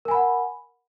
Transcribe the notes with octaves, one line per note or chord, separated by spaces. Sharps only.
A#4 F#5 G#5 B5